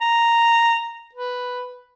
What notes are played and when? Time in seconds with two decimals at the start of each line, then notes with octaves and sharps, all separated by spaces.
0.01 A#5
1.14 B4